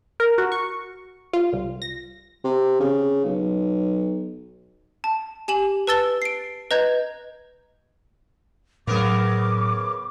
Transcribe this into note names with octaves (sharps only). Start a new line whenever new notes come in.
A#4
F#4
C#6
F4
C2
A#6
C3
C#3
B1
A5
G4 G#5 E7 F#7
B4 A5 E6 A6 G7
C7 D7
B4 D#5 A#5 G6 G#6
A2 C#3 F#3 B3 A#4 D6